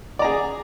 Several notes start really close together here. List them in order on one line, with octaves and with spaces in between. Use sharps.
D5 A#5 G#4